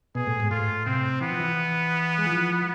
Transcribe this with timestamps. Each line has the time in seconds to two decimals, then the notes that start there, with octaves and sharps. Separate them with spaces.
0.15 B2 G#4
0.27 A2
0.40 G#2
0.51 A2 F4
0.86 C3 C4
1.21 E3 B3
1.31 F3
1.40 E3
2.18 G#3
2.26 F3